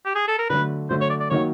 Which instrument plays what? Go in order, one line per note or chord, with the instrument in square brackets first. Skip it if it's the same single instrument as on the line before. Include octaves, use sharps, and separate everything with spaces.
[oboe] G4
G#4
A4
A#4
[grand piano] D3 F#3 A3 [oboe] B4
[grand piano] D3 F#3 A3 [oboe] C5
[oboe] C#5
D5
D5
[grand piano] D#3 F#3 A#3 D#4 F#4 [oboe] C#5